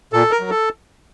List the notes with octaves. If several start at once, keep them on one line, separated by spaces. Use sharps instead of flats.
A#2 A4
A#4
F#3
A4